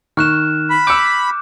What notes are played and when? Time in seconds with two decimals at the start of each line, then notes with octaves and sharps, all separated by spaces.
0.17 D#3 C#6 F6 F#6 E7
0.70 B5
0.87 D6 E6 G6 C#7 D7